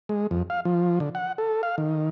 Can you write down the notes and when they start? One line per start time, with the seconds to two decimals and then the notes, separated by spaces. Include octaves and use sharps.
0.09 G#3
0.31 F2
0.50 F5
0.65 F3
1.00 D3
1.15 F#5
1.38 A4
1.63 F5
1.78 D#3